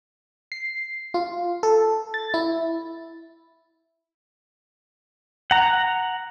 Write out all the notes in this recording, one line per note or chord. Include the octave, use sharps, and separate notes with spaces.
C7
F4
A4
A6
E4
F#5 A#5